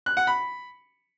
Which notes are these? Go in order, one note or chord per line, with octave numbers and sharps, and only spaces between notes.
F#6
F#5
B5